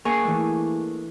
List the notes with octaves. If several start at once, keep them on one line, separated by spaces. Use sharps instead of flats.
A#3 G#4 C#6 C7
E3 A3 D4